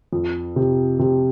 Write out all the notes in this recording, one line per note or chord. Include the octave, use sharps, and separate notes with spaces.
F2
C3
C3